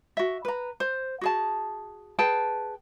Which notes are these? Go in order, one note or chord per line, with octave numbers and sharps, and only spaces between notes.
F#4 E5
B4 A#5
C5
F#4 G#4 A5
G#4 B4 G5 A5